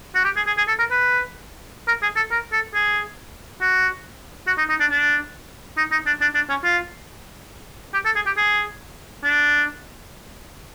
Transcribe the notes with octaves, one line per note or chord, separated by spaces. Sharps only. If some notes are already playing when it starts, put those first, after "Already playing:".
F#4
G4
G#4
G#4
G#4
A4
A#4
B4
A#4
G#4
A4
A#4
A4
G#4
F#4
F#4
D#4
D#4
D4
D4
D#4
D#4
D4
D4
D4
C#4
F4
G4
A4
G#4
G4
G#4
D4